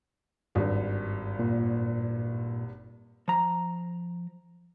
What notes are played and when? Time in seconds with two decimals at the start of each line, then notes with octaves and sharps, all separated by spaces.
0.55 G#1 G2
1.39 A#2
3.28 F3 A#5